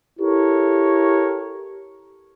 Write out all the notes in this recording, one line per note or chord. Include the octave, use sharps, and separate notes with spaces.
E4 G4 A4 A#4 C#5